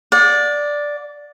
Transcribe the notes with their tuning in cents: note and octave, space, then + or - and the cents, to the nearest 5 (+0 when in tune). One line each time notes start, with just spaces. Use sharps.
D5 +0 F#5 -45